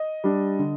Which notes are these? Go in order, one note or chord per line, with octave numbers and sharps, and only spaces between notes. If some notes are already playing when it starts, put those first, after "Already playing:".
Already playing: D#5
G3 D4
D3